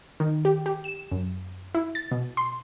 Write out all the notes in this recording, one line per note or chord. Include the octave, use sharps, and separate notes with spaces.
D#3
G4
G4
E7
F#2
E4
A6
B2
C6